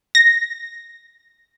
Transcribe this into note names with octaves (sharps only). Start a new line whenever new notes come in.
A#6